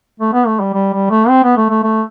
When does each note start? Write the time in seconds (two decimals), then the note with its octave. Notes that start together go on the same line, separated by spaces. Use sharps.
0.20 A3
0.33 B3
0.46 A3
0.60 G3
0.74 G3
0.93 G3
1.10 A3
1.29 C4
1.43 B3
1.57 A3
1.70 A3
1.83 A3